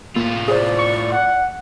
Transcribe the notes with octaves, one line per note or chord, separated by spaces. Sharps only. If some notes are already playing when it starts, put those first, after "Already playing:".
A2 A#3 F4
G#4 C5 D5
C#6
F#5